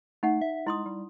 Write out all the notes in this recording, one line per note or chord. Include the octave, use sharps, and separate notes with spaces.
A3 D#4 F#5
E5
G#3 E4 C6 D#6
G3